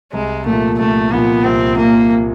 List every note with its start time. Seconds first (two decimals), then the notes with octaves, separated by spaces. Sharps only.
0.13 C2 G#3
0.46 A#2 F3 A3
0.78 C2 A3
1.11 A#2 F3 B3
1.44 C2 C4
1.77 A#2 F3 A#3